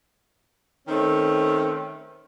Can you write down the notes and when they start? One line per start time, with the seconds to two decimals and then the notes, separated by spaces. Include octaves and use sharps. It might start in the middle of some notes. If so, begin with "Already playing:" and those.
0.88 D#3 A3 C4 C#4